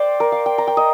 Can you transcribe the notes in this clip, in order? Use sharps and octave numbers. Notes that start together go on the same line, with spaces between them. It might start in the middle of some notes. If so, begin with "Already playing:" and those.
Already playing: C5 D5 G5
A#4
F5
G5
A#5
G5
D#5